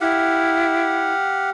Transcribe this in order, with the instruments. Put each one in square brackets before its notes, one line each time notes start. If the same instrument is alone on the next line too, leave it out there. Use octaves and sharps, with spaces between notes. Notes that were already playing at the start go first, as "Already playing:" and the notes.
[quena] E4 [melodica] G4 F5 F#5